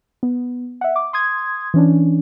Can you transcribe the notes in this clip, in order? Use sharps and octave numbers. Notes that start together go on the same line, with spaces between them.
B3
E5 F#5
D6
C6 D#6 G#6
E3 C#4 D4